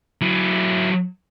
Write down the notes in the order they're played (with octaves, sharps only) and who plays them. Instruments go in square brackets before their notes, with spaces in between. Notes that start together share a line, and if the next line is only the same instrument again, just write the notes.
[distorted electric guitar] F#3 E4